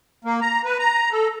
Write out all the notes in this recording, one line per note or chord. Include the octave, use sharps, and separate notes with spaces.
A#3
A#5
B4
A#5
A4